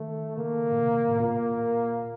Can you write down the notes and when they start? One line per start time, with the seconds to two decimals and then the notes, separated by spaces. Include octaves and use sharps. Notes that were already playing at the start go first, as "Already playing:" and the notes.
Already playing: D#3 A3
0.37 C#3 A#3
0.72 A#2
0.79 C3
1.09 A2
1.19 A#2 A#3